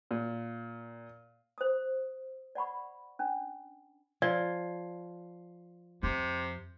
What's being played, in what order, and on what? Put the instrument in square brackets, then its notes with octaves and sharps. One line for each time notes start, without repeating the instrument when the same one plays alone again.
[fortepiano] A#2
[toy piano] C5 D#6
D5 F#5 B5 C#6
C#4 D4
[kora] F3 [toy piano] D5
[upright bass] F2 [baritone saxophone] C3